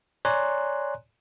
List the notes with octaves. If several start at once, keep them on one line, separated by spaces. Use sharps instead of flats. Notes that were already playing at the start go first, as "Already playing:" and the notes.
C#5 D5 G#5 A#5 C6 F#6